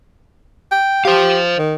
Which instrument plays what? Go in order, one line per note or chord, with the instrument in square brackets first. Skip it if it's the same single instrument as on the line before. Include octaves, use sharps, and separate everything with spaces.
[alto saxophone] G5
[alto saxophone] G4 [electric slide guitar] C5 F5
[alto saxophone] D#3